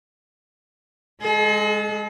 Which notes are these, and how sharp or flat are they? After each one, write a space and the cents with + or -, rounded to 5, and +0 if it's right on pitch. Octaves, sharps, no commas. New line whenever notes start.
G#3 +0 A4 -45